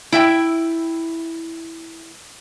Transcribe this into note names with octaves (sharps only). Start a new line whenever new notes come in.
E4 E5 G5